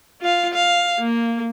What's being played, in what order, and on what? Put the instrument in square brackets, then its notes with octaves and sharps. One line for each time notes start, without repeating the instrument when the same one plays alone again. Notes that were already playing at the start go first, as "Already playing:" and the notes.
[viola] F4 F5
F5
A#3